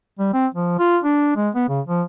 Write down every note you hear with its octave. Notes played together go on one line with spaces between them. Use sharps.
G3
C4
F3
F4
D4
G#3
B3
C#3
F3